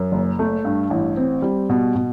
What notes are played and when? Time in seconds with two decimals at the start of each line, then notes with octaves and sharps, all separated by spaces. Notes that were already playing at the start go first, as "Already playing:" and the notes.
Already playing: F#2
0.12 F#1
0.39 A3
0.64 G2
0.90 A1
1.17 C4
1.42 G3
1.69 B2
1.95 B2